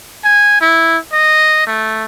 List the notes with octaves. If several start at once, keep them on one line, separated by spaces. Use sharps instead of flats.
G#5
E4
D#5
A3